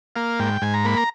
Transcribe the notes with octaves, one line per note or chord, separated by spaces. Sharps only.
A#3 F5
G#2 G5
G#2 G#5
A#5
A#3 B5
A#5